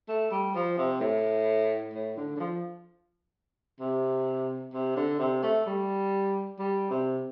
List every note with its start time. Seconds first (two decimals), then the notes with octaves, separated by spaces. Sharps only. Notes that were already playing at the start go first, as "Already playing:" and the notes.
0.08 A3
0.31 G3
0.55 F3
0.78 C3
1.00 A2
1.93 A2
2.17 D3
2.36 D3
2.40 F3
3.80 C3
4.73 C3
4.96 D3
5.19 C3
5.43 A3
5.66 G3
6.59 G3
6.90 C3